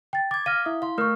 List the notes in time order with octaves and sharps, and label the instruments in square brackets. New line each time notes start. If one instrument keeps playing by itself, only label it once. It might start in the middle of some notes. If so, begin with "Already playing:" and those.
[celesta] G5 A6
[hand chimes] D6 G#6 [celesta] A6
[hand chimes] F5 [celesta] F6 A#6 D#7
[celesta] E4 E5 D#6
[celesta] E4 C6 [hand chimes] F5
[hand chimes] A3 A#4 [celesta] C#6 F6